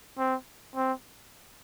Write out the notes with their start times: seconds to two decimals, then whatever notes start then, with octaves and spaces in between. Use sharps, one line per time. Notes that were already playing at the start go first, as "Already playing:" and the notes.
0.18 C4
0.76 C4